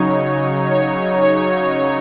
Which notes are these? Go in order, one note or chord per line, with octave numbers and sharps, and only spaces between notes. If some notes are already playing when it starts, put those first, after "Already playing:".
Already playing: C#3 F#3 D#4 C#5
C#5
C#5